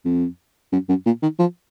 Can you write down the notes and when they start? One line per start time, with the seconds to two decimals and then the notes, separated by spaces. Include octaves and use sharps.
0.05 F2
0.72 F#2
0.89 F#2
1.06 A#2
1.22 D#3
1.39 F3